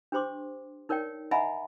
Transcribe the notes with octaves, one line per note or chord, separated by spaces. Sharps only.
D4 G4 C5 C6 D6
D#4 A#4 C#5 D5 G5
D#5 E5 F#5 G#5 A#5 B5